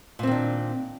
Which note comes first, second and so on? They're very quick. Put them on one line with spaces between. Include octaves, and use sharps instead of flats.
A#2 C4 D#3 D4